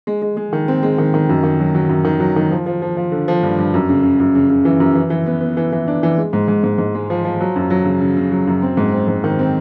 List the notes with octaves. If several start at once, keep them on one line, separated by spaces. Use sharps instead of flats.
G#3
G#3
G#3
D#3
C4
G#3
D#3
D#3
F#2
D#3
F#3
F#3
F#2
D#3
F#3
D#3
F3
F3
F3
F3
D3
F3
G2
G2
F#2
C#3
C#3
F#2
C#3
C#3
E3
F#2
E3
E3
B3
B3
E3
E3
D4
E3
G#3
G#2
G#2
G#2
G#2
G#3
F3
F3
F#3
F#2
F#3
C#3
C#3
C#3
F#3
F#2
C4
G#2
C4
G#2
D#3
C4